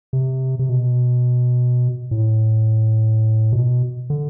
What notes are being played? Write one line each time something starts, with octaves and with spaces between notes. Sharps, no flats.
C3
C3
B2
A2
B2
D3